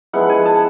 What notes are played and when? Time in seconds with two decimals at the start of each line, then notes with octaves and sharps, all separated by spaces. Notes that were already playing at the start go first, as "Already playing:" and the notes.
0.13 F3 G#3 B3 E4 F#5
0.29 G#5
0.46 A5